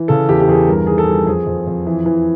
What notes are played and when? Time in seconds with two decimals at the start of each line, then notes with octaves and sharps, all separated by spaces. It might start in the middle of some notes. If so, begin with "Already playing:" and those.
Already playing: E3
0.08 C#3 A4
0.29 E2 G4
0.40 G4
0.48 E2 G#4
0.68 G2 A#4
0.87 D#3 G#4
0.98 A4
1.07 G2
1.26 F2 G#4
1.47 F2
1.67 F2
1.87 E3
2.06 E3